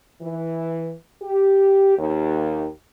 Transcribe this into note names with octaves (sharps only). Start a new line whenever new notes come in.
E3
G4
D#2